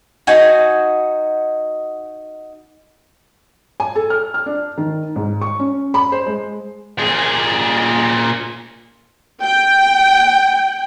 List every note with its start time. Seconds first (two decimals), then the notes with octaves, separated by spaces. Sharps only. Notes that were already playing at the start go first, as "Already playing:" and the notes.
0.27 D#4 F#4 G#5
3.80 G#5
3.96 A4
4.10 F6
4.34 F6
4.46 D4
4.78 D#3
5.16 G#2
5.41 C#6
5.59 C#4
5.94 B5
6.12 C5
6.26 G#3
6.99 A#2 G#4
9.42 G5